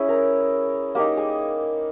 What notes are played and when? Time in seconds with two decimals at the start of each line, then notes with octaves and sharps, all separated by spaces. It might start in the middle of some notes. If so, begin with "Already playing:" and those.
Already playing: C#4 E4 G#4
0.09 A#4
0.95 A#3 D#4 G4
1.17 G#4